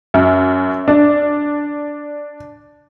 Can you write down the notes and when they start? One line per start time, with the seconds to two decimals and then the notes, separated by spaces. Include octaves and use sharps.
0.14 F#2
0.88 D4